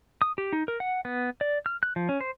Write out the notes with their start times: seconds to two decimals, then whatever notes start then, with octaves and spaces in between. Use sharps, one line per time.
0.22 D#6
0.38 G4
0.53 D#4
0.68 A#4
0.80 F#5
1.05 B3
1.41 D5
1.66 F6
1.83 F#6
1.96 F3
2.09 C#4
2.21 C5